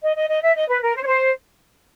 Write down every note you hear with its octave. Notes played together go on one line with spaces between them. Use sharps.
D#5
D#5
D#5
E5
D#5
B4
A#4
C5
C#5
C5